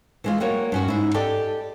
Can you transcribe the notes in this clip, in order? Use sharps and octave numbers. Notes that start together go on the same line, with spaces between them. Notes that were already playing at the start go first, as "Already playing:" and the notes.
E3 G#3 F4
G3 A#3 F#4 C#5
G2 C#4 F#4
G#2 E4
G4 A4 D5 D#5 G5